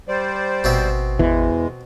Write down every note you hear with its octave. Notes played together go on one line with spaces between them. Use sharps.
G3 C5 D5
G#1 B2 C4 E5
E2 E3 G#3